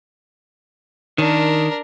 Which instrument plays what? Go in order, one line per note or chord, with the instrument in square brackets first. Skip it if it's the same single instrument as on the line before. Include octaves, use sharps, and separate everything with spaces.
[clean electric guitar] D#3 [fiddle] D4 A#4